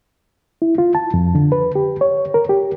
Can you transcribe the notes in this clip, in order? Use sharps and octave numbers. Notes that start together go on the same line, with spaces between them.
E4
F4
A5
F2
D3
B4
G4
C#5
A#4
G4